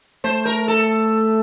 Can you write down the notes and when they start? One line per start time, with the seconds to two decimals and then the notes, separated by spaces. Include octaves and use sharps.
0.24 A3 C5
0.45 A#4
0.68 A4